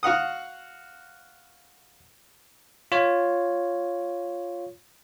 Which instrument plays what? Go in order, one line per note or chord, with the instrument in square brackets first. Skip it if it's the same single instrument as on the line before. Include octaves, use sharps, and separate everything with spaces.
[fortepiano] F#4 F5 F#5 D#6
[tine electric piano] F4 C#5